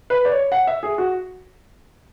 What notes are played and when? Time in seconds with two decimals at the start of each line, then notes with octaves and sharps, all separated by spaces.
0.10 B4
0.25 D5
0.32 C#5
0.52 F#5
0.67 E5
0.83 G#4
0.98 F#4